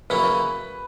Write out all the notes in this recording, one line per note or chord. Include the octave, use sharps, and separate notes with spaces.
C#3 F#3 A#3 C#4 E4 B4